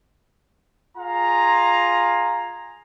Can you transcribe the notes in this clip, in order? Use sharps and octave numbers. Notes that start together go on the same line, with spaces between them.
F4 G#4 F5 A#5